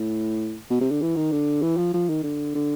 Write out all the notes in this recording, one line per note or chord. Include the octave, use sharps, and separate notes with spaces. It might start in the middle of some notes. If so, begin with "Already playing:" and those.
Already playing: A2
B2
C3
D3
E3
D#3
D3
E3
F3
F3
D#3
D3
D3